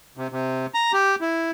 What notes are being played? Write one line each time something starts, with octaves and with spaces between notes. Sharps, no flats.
C3
C3
A#5
G4
E4